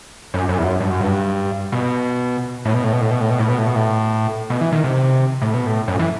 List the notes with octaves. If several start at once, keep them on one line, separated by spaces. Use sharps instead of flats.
F#2
F#2
E2
F#2
G2
F#2
G2
B2
A2
B2
A2
B2
A2
B2
A2
B2
A2
B2
A2
B2
A2
B2
E3
D#3
C3
A2
B2
A2
F#2
E3